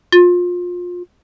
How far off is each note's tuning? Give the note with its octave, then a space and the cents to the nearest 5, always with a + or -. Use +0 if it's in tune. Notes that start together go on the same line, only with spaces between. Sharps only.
F4 +25